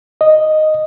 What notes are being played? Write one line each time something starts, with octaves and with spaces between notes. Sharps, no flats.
D#5